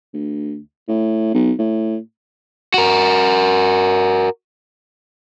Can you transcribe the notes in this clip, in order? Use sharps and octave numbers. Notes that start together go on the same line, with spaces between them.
D2
A2
B1
A2
F#4 A#4